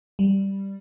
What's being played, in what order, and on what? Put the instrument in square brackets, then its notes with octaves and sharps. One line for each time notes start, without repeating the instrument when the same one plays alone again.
[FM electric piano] G3